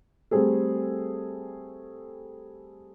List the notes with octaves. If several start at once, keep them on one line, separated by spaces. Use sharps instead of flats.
G3 A3 C4 G#4 A4